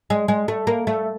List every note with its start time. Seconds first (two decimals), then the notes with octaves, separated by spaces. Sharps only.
0.10 G#3
0.28 G#3
0.48 A3
0.67 A#3
0.87 A3